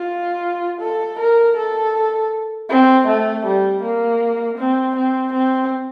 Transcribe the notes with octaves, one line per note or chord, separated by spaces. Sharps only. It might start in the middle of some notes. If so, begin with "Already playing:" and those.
Already playing: F4
A4
A#4
A4
C4
A3
G3
A#3
C4
C4
C4